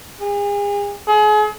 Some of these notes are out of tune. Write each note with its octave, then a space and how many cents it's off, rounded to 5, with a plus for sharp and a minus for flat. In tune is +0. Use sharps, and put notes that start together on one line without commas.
G#4 -35
G#4 +35